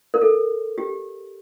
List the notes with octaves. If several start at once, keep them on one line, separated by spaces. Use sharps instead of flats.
A#4
A4
G4